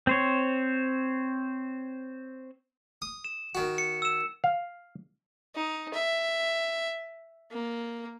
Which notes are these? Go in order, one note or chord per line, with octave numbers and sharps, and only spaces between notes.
C4 C5 C#5
D#6
E7
D#3 F#4
C#7
E6 E7
F5
D#4
E5
A#3